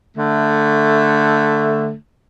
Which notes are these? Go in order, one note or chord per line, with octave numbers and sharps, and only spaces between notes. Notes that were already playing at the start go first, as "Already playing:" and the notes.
D3 A3